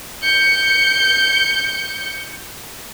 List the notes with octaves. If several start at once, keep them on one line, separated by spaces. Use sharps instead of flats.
G6 C#7